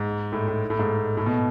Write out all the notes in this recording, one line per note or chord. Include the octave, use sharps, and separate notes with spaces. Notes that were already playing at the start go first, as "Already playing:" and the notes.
Already playing: G#2
A2
A2
A2
G#2
A2
B2